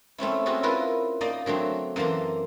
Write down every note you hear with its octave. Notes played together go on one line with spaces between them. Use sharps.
A3 C4 C#4 E4
C4 C#4 F#4 G#4 A4
E4 F4 A#4 B4
A#3 D#4 D5 D#5
D3 F#3 A3 C4
F#2 E3 A#3 A5 A#5 C6